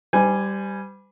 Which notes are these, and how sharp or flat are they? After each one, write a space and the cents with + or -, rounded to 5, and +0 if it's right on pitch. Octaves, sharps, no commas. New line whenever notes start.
G3 +0 C5 -45 G#5 +0